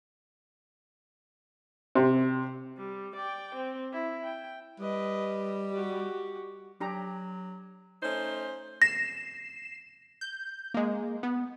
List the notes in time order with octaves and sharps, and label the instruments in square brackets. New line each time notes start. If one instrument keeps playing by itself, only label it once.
[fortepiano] C3
[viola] G3
D5 G5
C4
E4
G5
[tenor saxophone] G3 [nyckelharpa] B4 D#5
[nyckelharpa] F#4 G4
[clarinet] F#3 [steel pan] D4 G4 A#5
[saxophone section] A3 C#4 D#4 C5
[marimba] A#6 [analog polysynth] C7 E7
[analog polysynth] G6
G#3 A#3
B3